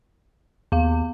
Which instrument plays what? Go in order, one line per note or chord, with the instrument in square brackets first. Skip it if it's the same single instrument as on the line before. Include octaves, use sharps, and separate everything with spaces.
[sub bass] D#2 [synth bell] B3 F5